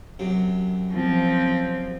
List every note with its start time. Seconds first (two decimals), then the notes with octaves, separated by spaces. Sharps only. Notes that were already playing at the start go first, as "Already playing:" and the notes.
0.19 F#2 C3
0.93 F3 C4